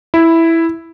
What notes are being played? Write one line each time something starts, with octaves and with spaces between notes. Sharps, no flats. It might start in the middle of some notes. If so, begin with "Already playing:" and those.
E4